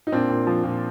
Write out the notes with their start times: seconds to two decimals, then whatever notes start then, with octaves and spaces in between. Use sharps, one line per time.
0.07 D#4
0.12 A#2 C4 D4
0.29 A#2
0.47 F3
0.64 A#2